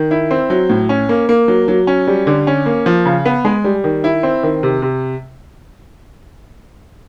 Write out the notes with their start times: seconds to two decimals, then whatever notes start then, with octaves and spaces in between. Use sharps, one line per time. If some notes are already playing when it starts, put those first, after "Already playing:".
Already playing: D#3
0.11 E4
0.31 C4
0.50 F#3
0.70 A2
0.89 C#4
1.09 A#3
1.29 A#3
1.48 F#3
1.68 F#3
1.87 C#4
2.07 G3
2.27 D3
2.47 C#4
2.66 A#3
2.86 F3
3.05 C#3
3.25 B3
3.45 G#3
3.64 G3
3.84 D#3
4.04 E4
4.23 C4
4.43 D#3
4.63 C3
4.82 C3